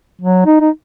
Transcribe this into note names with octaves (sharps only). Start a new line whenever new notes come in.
F#3
D#4
D#4